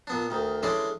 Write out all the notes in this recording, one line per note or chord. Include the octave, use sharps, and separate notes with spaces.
A#2 B3 D4
D2 D#3
D3 E3 G#3 C#4 D5 C6